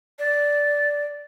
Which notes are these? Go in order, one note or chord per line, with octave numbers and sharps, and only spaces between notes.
D5